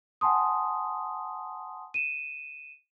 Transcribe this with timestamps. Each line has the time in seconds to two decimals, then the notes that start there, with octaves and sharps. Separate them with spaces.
0.21 F#5 G#5 A5 C6 D#6
1.94 D#7 E7